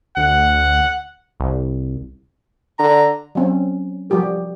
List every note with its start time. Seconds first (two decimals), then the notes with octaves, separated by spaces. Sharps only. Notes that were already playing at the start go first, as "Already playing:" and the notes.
0.17 D2 F#5
1.40 C2
2.79 D3 A#5
3.35 F#3 C4 C#4
4.10 F3 G3 F#4 G4 A#4